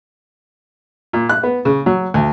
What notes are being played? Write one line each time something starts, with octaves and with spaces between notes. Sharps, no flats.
A#2
F#6
B3
C#3
F#3
D2